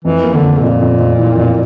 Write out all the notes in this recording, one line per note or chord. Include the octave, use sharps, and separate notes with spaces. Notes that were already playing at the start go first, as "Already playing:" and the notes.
F2 E3
A#3
D3
F2
F2 A#2
F2
F2
E3
F2